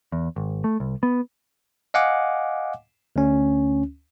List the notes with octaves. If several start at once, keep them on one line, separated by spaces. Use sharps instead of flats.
E2
G#1
A3
C2
B3
D#5 F5 F#5 G#5 D6
D2 C#4